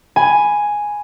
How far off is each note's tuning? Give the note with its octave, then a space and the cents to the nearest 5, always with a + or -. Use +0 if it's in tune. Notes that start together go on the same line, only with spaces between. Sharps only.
G#5 +0 B5 +0